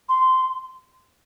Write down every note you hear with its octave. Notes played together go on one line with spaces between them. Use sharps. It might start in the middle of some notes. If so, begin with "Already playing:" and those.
C6